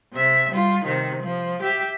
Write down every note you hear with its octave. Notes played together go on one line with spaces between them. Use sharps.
C3 E5
G3 F4
C3 D#3
F3
G4 E5